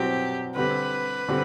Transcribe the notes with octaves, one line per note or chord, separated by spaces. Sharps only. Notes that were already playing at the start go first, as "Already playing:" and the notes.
Already playing: C2 B2 F#3 C4 G4
D3 G3 C4 G4 B4
D3 G3 C4 G4